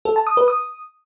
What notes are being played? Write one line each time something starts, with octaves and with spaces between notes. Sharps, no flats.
A4
A5
D#6
B4
D#6